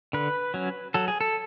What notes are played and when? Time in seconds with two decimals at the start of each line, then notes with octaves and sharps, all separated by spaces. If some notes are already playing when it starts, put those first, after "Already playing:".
0.13 D3 B4
0.54 F#3 C#4
0.94 F#3 A4
1.08 G#4
1.21 A4